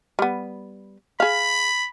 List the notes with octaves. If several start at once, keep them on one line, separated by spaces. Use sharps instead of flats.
G3 B3
G#4 F5 B5